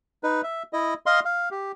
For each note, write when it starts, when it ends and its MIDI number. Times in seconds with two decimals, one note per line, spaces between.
0.23 0.42 63
0.23 0.42 71
0.43 0.63 76
0.73 0.94 64
0.73 0.94 75
1.06 1.20 75
1.06 1.20 77
1.06 1.20 84
1.25 1.49 77
1.51 1.72 67